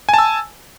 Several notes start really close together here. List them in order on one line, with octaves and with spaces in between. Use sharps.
G#5 A5 E6